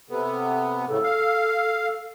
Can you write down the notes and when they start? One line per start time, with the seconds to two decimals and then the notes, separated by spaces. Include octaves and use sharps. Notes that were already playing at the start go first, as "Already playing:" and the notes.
0.10 C3 B3 A4
0.88 A2 C#3 A4
1.03 F5